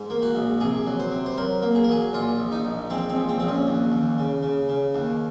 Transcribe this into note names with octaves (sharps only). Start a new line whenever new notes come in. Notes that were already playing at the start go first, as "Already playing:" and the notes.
Already playing: G#2
A#3
F#4
A#1
C3 G#4
F#3
C5
C3
C5
F#3 A#4
A#3
G#4
A#4
F#3 G#4
A#1 F4
A#1
D#4
A#1
G#3 C4
C4
A#1
C4
A#1 C4
C#4
D#2
D#2
C#3
C#3
C#3
D#2